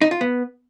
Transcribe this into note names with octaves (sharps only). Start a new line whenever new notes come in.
D#4
F4
B3